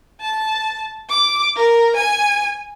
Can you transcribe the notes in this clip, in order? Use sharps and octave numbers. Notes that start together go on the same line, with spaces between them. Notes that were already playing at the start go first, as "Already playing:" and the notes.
A5
D6
A#4
G#5